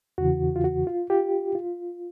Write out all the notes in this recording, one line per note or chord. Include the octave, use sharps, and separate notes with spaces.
E2 C#3 E3 F#4
F4
F#4
F4
F4 G4
F4